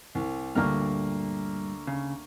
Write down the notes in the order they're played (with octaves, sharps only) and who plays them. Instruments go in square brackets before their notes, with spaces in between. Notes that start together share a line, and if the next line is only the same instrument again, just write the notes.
[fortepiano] C2
[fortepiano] D2 A#3 F6 [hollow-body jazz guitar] G2 A#2
[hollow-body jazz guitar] C#3